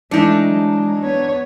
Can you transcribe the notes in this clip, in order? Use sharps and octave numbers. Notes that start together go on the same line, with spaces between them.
E3 G#3 A3 D4 D#4 E5 C#7
F#3
B3 C#5